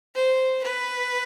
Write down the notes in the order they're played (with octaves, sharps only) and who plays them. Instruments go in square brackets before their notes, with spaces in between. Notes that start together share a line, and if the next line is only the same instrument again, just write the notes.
[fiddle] C5
B4